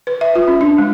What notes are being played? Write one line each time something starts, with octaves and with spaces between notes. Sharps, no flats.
B4
E5
F4
C#4
D4
G#3